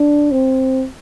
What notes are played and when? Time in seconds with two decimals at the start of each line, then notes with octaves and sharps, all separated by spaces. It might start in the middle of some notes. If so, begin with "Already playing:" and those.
Already playing: D4
0.31 C4